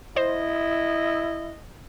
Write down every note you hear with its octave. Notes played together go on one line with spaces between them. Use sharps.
E4 C5 D#5